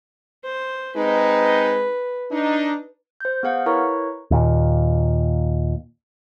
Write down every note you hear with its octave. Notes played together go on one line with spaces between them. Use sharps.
C5
G#3 C4 D#4 B4
D4 D#4
C5 G6
B3 G#4 F5 F#5
E4 A#4 B4 C#5 A#5 C#6
D#2 A#2